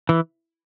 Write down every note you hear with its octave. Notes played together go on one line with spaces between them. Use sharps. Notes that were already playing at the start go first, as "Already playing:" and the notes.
E3